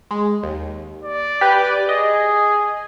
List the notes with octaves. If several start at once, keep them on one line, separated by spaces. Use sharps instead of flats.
G#3
D#2
D5
G4 B4
G#4 D#5